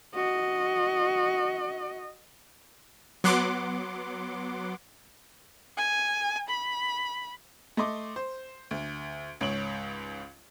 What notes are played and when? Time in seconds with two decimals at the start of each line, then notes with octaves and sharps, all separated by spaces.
0.14 F#4 D#5
3.24 F#3 B3 F#5 C6 D6
5.77 G#5
6.49 B5
7.77 A3 D#5 C6 D6
8.16 C5
8.71 D2
9.41 C#2 G#2 C#5 D7 F#7